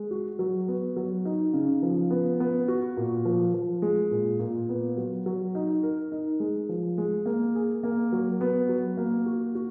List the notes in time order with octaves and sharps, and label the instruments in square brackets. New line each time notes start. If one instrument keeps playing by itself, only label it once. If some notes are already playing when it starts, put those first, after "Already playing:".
Already playing: [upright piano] G#3
F#4
F#3
B3
F#3
D#4
C#3
F3
B3
B3
F#4
A#2
F3
F3
G#3
A#2
A#2
B3
F#3
F#3
D#4
A#4
D#4
G#3
F3
G#3
A#3
G#4
A#3
F#3
B3
F#3
A#3
F#4
F#4